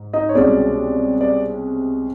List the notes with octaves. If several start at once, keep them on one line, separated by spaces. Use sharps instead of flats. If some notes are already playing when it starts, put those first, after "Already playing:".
Already playing: G#2
D#4 D#5
C#5
C2 B2 G#3 C#4 D5
D5